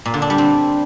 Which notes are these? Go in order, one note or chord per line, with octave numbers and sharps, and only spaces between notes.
A#2
D3
D4
G3
C4